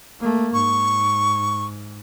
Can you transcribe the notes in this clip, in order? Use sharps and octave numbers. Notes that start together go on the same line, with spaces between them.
A3 A#3
G#2 C#6